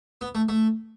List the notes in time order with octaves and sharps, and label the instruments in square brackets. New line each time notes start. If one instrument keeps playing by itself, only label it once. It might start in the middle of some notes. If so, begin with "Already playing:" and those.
[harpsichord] B3
A3
A3